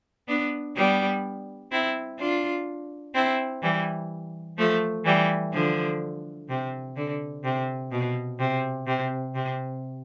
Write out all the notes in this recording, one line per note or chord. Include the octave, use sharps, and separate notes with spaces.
B3 D4
G3 B3
C4 E4
D4 F4
C4 E4
E3 G3
F3 A3
E3 G3
D3 F3
C3
D3
C3
B2
C3
C3
C3